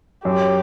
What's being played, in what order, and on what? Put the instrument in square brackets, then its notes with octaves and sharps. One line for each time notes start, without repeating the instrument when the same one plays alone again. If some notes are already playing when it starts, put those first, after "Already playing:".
[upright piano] F#2 [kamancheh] G4